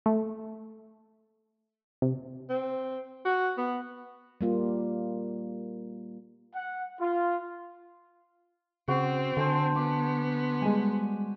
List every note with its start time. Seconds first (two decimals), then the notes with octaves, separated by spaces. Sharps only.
0.06 A3
2.02 C3
2.50 C4
3.25 F#4
3.57 B3
4.41 G3 A#3 F4
6.55 F#5
7.01 F4
8.88 C#3 C4 F#4
9.37 D3 C5 G#5 A5
9.76 B3 A5 D6
10.62 G3 G#3 G#5